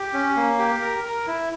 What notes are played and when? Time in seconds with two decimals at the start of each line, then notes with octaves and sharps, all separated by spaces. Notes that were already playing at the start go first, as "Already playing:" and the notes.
Already playing: G4
0.13 C#4
0.36 A#3
0.59 G4
0.82 A#4
1.04 A#4
1.27 E4